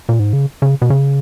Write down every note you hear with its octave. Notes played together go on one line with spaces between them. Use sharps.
A#2
G#2
C#3
C#3
B2
C#3